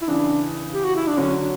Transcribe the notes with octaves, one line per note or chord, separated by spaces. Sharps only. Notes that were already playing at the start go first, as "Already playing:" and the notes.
E4
C#3 E3 D4
G4
F#4
E4
D4
D3 F#3 C#4